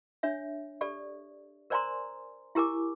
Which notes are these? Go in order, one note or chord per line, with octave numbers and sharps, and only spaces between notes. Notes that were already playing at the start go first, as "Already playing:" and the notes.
D4 C#5 E5
G4 A4 D5
A#4 C5 D5 G#5 A#5 C6
E4 G4 A#4 G#5 D6